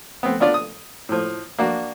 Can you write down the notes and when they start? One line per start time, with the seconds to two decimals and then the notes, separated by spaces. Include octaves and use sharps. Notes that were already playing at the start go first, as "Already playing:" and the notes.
0.23 B3 C4
0.40 B3 D4 F4 D5
0.54 D#6
1.09 A2 F3
1.59 A#3 D4 F#4